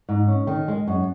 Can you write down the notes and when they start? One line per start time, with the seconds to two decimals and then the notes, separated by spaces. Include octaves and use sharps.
0.09 G#2
0.27 C#4
0.47 D#3
0.68 G#3
0.87 F#2